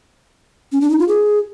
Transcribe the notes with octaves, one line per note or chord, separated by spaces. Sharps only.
C#4
D4
D#4
F4
G#4